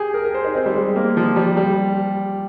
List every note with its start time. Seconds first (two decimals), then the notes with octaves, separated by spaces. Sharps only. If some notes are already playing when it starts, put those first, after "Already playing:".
Already playing: G4 G#4
0.14 A#4
0.24 A#4
0.34 C5
0.45 D#4
0.55 C4
0.66 G3
0.75 G#3
0.96 A#3
1.17 F3
1.36 G3
1.57 G3